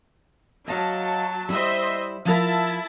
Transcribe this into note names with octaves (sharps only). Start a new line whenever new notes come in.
F#3 D#5 F5 A5
G3 E4 C5 D#5 E5
F3 E4 F4 A#4 E5 A5